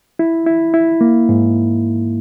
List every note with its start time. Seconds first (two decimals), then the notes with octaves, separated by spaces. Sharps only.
0.19 E4
0.46 E4
0.74 E4
1.01 A#3
1.29 G#2